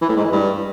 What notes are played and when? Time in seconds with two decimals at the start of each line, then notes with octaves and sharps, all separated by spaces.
0.01 E3
0.09 A2
0.17 G#2
0.25 E3
0.32 G2